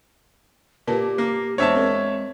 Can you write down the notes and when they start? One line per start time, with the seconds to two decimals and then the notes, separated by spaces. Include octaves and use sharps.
0.87 A#2 G4 A#4 B4 A5
1.18 A#3
1.58 E2 G#3 D4 C5 C#5 E5 A5
1.75 C4 A#4